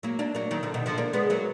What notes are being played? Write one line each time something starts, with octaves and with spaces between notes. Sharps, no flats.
F#3 A#3
A#3 D4
F#3 A#3
D#3 F#3
D3 F3
B2 D#3
D3 F3
A#3 D4
G#3 B3
F#3 A#3